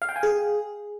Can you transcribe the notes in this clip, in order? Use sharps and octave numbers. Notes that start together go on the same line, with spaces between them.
F5
G5
G#5
G#4